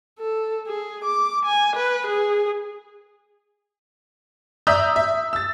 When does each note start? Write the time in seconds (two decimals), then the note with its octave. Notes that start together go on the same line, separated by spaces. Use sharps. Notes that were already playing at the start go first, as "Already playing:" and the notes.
0.19 A4
0.67 G#4
1.05 D6
1.46 G#5
1.76 B4
2.07 G#4
4.67 D5 E5 A#5 D#6 E6 G6
4.96 E5
5.33 E6 A6